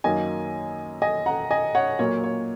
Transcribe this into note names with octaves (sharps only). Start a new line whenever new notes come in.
F#2 D#3 F#3 A#3 D#5 G#5
D#5 G#5
F#5 A#5
D#5 G#5
C#5 F#5
A#2 F#3 A#3 C#5
C#5